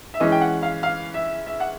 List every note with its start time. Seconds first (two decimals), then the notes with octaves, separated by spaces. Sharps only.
0.14 E5
0.20 E3 G#3 C#4 D#5
0.32 G5
0.41 F#5
0.62 F5
0.83 F5
1.14 E5
1.46 E5
1.60 F#5